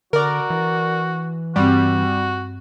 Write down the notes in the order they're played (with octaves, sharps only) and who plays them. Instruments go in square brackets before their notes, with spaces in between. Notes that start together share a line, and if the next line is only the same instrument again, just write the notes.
[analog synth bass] D3 [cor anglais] F#4 [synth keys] A#4 D5
[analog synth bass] E3
[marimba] G2 C4 [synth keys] G3 [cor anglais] F#4